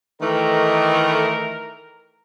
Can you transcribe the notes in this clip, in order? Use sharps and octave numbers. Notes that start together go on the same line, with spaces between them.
D#3 E3 A3 A#4